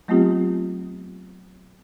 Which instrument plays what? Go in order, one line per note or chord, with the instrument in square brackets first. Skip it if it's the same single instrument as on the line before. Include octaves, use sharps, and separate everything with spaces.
[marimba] F#3 A3 B3 C4 F4 G4